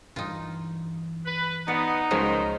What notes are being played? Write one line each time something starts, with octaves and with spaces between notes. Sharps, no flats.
G2 E3 D#4 F4
B4
B3 D#4 D5
C#2 B2 D#3 F3 F#3 G#3